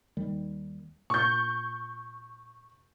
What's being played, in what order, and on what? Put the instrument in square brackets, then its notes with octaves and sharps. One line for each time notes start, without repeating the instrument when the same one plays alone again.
[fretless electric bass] D#2 D#3 G3
[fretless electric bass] A#2 [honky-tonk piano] C#6 G6